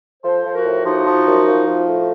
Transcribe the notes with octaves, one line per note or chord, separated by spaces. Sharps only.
F3 A4 C5
F3
F#4 A#4
A2
F3 D#4 F#4
F3
F#2
F3
F3
A2